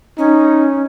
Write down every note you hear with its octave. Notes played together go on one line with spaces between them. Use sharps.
C#4 D#4